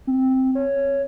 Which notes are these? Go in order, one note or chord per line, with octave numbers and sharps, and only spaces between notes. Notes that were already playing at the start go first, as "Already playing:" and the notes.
C4
C#5